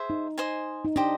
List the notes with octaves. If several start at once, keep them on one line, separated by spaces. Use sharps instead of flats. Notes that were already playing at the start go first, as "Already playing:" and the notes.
Already playing: G#4 C5 E5
D#4
C5 D#5 G#5 C6
D#4
D4 G4 C5 D#5